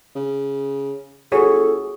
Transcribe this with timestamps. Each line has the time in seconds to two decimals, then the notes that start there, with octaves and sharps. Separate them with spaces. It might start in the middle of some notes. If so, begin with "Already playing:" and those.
0.15 C#3
1.32 G1 F#4 G#4 A4 C#5